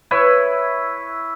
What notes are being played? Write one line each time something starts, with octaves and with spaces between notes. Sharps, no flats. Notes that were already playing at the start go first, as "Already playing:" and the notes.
E4 B4 C#5 E5